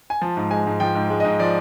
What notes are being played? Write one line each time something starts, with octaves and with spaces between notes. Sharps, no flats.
G#5
F3 A5
G#2
G#3 G#5
G#2
F3 G5
G#2
G#3
G#2 D#5
F3 D5